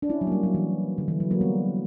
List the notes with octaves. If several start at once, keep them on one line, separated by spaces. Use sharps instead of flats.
D4
C#4 E4
F#3
A#3
G3
F#3
E3
D3
E3
F#3
F#3 A#3
G3 B3